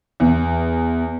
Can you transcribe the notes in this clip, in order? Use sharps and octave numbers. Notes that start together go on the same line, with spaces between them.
E2